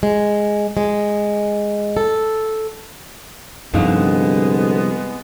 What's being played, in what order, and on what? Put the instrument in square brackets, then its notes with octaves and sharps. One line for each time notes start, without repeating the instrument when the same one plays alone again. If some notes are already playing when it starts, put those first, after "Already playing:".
[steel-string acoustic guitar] G#3
G#3
A4
[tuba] C2 [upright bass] G2 F3 [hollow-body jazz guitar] D3 D#4 F5 [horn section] G#3 B3